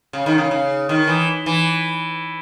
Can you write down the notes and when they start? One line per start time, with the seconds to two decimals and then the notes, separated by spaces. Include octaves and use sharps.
0.13 C#3
0.26 D#3
0.38 C#3
0.51 C#3
0.89 D#3
1.07 E3
1.46 E3